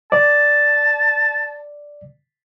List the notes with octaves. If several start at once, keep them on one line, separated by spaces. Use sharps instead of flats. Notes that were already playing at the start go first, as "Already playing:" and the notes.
D5 A5